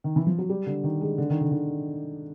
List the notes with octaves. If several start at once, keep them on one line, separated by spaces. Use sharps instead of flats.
D#3
E3
F3
F#3
G3
D3
D#3
G#3
D3
D#3
D3
D#3